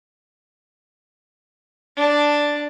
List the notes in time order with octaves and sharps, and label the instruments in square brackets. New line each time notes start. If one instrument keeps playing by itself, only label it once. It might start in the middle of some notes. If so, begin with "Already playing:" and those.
[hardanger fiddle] D4 A5